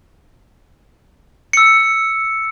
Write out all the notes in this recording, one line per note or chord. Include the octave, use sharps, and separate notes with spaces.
E6 C#7